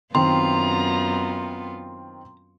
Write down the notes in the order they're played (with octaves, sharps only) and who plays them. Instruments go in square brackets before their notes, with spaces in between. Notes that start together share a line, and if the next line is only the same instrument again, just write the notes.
[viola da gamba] F#2 B3 F4 [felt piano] D#3 C4 [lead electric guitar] A#5 [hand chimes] C6